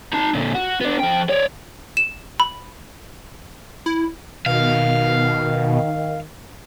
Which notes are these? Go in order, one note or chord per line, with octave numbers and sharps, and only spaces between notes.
D#4 A5
A#2 D3
F#4
B3 D4
F3 G5
C#5 D5
E7
B5
E4
B2 D#3 F5